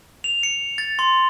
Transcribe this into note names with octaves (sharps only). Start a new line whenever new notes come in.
F7
C#7
A6
C6